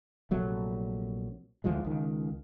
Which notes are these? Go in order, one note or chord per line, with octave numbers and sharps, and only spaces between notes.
A#1 C3 F#3 A3
D2 E3 F3 G#3
C#2 D#3